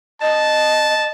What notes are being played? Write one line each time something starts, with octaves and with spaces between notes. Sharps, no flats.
D#5 A5